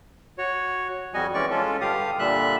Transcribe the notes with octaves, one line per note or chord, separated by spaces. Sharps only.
F#4 C#5
F2 G3 F#4 D#5 G#5
E3 G#3 C#4 D5 C#6
G#3 C#4 F4 A4
G2 D3 G4 F5 D#6
A#2 D3 G3 E5 F#6